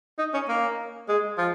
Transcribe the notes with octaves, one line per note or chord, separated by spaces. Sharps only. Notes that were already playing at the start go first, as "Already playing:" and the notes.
D#4
C#4
A#3
G#3
F3